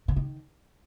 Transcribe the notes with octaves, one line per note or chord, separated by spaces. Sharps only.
D3
D#3